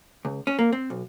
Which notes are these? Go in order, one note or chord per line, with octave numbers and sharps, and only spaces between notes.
C#2
C#4
A#3
C4
B1